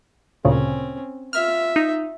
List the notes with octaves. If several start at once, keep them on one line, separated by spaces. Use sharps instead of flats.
D2 A#2 C#3 C4 C#4
F4 E5 F6
D#4